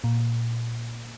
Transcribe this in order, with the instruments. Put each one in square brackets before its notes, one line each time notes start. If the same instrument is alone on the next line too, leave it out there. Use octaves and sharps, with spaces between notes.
[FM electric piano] A#2